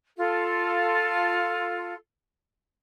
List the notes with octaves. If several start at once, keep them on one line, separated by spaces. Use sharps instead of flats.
F4 A4